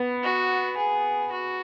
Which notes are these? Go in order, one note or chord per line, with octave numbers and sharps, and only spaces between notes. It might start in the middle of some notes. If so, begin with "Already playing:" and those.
Already playing: B3
F#4
G#4
F#4